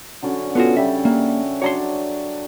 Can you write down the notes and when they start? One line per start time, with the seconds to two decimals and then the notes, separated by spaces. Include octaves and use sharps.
0.23 D3 F#3 C#4
0.55 B3 F4 F#4 A4 G#5
0.77 C#3 G3 G4 E5
1.05 A#3 E5 F#5
1.62 F#3 D4 C#5 A#5 C6